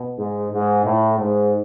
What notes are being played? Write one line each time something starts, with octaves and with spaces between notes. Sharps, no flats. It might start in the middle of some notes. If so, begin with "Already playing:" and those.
Already playing: B2
G#2
G#2
A2
G#2